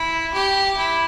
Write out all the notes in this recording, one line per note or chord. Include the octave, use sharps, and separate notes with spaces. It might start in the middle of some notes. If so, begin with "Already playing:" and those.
Already playing: E4
G4
E4